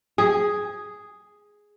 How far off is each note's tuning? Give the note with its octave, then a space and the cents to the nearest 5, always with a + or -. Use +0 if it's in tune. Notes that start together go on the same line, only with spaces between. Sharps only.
G#4 +0